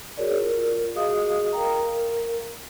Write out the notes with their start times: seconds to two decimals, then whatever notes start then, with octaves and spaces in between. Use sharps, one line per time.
0.17 F#4 G#4 A#4 C#5 D5
0.40 F4 A#4
0.95 F#4 G#4 D#5 F5 D#6
1.53 A#4 F5 G5 A#5
1.82 A#4